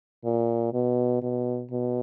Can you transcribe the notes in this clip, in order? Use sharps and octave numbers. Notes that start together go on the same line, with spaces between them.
A#2
B2
B2
B2